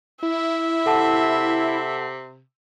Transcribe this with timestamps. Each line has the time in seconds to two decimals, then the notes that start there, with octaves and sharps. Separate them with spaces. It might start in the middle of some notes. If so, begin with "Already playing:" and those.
0.23 E4 E5
0.86 C3 A4 F#5 A5